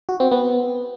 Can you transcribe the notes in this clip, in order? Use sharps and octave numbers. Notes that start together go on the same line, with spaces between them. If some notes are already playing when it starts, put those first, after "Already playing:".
F#4
C4
B3